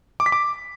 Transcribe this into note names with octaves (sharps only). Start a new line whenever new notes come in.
D6
B6
D6